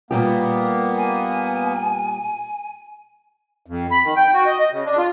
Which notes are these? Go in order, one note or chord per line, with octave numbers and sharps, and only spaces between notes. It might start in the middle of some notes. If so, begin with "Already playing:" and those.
A#2 G3 A#3 B3 G4
G#5
F2
B5
D#3
G5
F#4
D#5
D#5
C#3
D4
F4